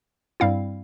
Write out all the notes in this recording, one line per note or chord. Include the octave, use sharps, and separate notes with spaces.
G2 G3 C4 E4 F5